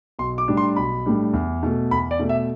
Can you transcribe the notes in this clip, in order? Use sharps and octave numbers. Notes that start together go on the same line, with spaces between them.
B1 C6
D6
A2 G3 D4
C6
B1 B5
A2 G3 D4
E2
B2 A3
E2 B5
D5
B2 A3
E5